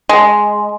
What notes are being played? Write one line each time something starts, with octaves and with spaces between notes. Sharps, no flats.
G#3